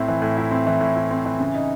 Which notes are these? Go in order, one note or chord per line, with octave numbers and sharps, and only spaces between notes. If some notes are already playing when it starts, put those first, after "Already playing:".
Already playing: A2 C4 E4
E3
A2
E4
C4
E3
A2
E4
C4
E3
C#3
D#4